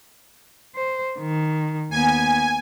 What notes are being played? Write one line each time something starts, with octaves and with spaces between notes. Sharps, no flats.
C5
D#3
D#2 B3 G#5